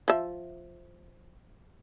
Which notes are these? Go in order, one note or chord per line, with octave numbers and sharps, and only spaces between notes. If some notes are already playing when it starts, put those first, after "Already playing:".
F3 E5